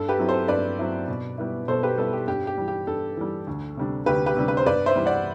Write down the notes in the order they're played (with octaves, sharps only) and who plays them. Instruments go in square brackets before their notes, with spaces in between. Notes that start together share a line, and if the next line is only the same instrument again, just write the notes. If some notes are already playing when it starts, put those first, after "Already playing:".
Already playing: [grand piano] G2 A4
G4 B4
F#3 C4 E4
A4 C5
G2 B4 D5
F#3 C4 E4
B2
G3 B3 E4
B2 A4 C5
G4 B4
G3 B3 E4 A4
G4
G2 G4
G4
E3 G3
G4
G2 A4
E3 G3
D2
C3 G3 D4
D2 G4 B4
G4 B4
C3 G3 D4
B4
C5
G2 B4 D5
C5 E5
E3 G3
D5 F#5